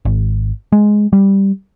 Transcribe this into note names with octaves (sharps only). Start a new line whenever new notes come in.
G#1
G#3
G3